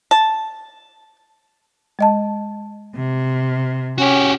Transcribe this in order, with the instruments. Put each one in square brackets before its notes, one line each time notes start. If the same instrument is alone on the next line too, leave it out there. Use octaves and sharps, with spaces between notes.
[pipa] A5
[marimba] G#3 D#5 A5
[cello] C3
[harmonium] C#4 [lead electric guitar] F#4 G4